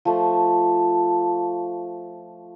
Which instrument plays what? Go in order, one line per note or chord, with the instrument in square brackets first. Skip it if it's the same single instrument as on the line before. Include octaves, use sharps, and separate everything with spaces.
[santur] F3 A3